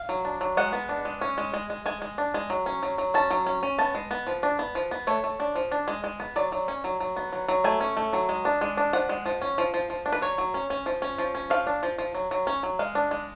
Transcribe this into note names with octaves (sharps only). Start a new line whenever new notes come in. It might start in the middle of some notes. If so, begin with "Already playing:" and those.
Already playing: F5
F#3
D4
F#3
G#3 F#5
B3
D4
G#3
C#4
G#3
G#3
G#3
G#3 G#5
G#3
D4
G#3
F#3
C#4
F#3
F#3
C#4 A5
F#3
C#4
C#4
B3 A5
G#3
B3
F3
D4
B3
F3
B3
A3 C#5
A3
D4
F3
D4
G#3
G#3
B3
F#3 D5
F#3
C#4
F#3
F#3
B3
F#3
F#3
A3 G#5
C#4
A3
F#3
G#3
D4
G#3
D4
F3 F#5
G#3
F3
C#4
F3
F3
F3
D4
B4
F#3 C#5
F#3
C#4
C#4
F3
C#4
F3
C#4
F3 F5
D4
F3
F3
F#3
F#3
C#4
F#3
G#3 F5
D4
G#3